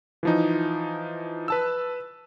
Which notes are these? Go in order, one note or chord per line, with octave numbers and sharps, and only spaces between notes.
E3 F3 D#4
B4 A5 E6